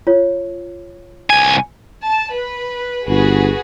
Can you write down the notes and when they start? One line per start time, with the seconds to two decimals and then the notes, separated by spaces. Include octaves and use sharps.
0.07 F4 C#5
1.30 C2 G#5
2.05 A5
2.34 B4
3.08 G1 F#4 G#4 B4